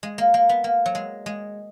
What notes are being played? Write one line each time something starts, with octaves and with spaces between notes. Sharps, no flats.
G#3
A#3
A#3
B3
A#3
F#3
G#3
G#3